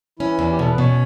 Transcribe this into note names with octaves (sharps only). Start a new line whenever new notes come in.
E3 C#4 E4
E2
G4
B2 A4
B4
B2 C#4 C#5